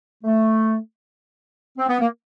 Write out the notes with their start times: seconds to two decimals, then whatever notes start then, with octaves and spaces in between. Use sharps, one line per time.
0.24 A3
1.78 C4
1.88 B3
2.00 A#3